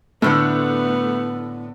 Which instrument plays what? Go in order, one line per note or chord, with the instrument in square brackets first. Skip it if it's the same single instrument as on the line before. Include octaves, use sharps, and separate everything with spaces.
[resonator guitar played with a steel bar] A2 D3 D4 [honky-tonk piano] A3 [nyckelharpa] B3